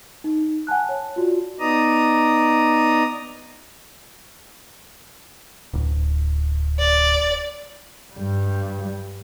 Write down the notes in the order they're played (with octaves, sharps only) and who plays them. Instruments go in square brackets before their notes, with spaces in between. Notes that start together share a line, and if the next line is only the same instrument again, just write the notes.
[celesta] D#4
F#5 G#5 A5 F#6
C#5 A5
F4 F#4 D5
[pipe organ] B3 D#4 D5 A#5 D#6
[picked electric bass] D1
[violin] D5
[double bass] G2 G3